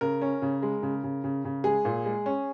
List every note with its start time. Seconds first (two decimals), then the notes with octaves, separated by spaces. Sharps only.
0.01 C#3 A#4
0.22 C#4
0.42 C#3
0.62 G#3
0.83 C#3
1.04 C#3
1.24 C#3
1.45 C#3
1.64 G#3 G#4
1.85 A#2
2.06 G#3
2.26 C#4